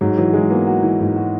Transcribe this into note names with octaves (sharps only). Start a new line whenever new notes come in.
G#2 F#3
E3 F#3
E3 G#3
A#3 B3
F#4
E3
G#2
F#4